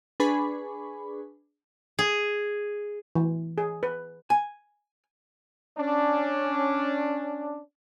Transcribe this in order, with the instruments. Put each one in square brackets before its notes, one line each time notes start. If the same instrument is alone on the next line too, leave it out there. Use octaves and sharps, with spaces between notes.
[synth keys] D4 G#4 B4 G#5 B5 C#6
[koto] G#4
[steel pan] E3
G#4
B4
[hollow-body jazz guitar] G#5
[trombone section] C#4 D4